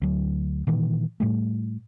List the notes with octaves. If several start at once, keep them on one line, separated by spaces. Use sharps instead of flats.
D2 F#3
A#2 D#3 E3
A2 G3 A3